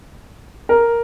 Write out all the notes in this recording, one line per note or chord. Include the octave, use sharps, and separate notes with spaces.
A#4